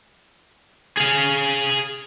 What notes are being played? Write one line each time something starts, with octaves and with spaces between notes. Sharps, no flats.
G#4 F5